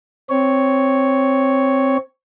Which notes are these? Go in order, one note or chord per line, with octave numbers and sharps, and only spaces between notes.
C4 C#5